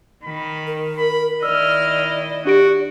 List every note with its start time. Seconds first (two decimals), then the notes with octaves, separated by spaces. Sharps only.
0.24 D#3 B5
0.67 A#4
0.98 B5
1.43 D#3 E4 D5 D#5 E6 F6
2.45 D4 F#4 G4 D7